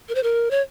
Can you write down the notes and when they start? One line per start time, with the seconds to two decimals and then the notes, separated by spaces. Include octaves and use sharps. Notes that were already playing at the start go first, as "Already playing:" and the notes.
0.09 A#4
0.15 C5
0.23 A#4
0.51 C#5